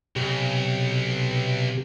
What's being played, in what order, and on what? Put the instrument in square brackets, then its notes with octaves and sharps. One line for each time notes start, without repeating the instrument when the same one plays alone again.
[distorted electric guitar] B1 [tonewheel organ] C3 G4